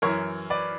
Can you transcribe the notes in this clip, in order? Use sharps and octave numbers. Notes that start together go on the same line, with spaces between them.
F#2 E3 A#4 C#5
B4 D5